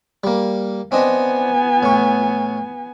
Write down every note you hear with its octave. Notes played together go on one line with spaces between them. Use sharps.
G3 A#3
B3 C4 D4 D#5 G#5
A2 C#6